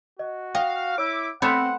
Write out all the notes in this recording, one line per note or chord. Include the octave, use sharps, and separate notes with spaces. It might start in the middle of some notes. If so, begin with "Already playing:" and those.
F#4 D#5
D#5 F5 G5
E4 C#5 D6 E6
A3 B3 C4 C#5 F#5 B5 C6 E7